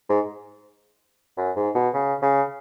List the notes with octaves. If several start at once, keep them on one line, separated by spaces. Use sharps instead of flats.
G#2
F#2
G#2
B2
C#3
C#3